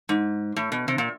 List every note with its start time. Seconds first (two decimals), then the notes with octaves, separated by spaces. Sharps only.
0.09 G#2
0.56 A2
0.72 B2
0.88 C3
0.98 A#2